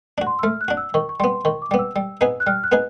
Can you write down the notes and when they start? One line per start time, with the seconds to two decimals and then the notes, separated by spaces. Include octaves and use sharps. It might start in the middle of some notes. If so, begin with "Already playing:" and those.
0.18 D4 F#4
0.27 C6
0.39 E6
0.43 A3 F6
0.61 F#6
0.68 D4 F#4
0.77 E6
0.94 D#3 C#6
1.09 C#6
1.20 G3 B3 C6
1.45 D#3 C#6
1.62 D6
1.71 G3 B3
1.79 E6
1.96 G3
2.21 B3 D#4 G#4 B4
2.40 F#6
2.47 G3 F6
2.64 F#6
2.72 B3 D#4 G#4 B4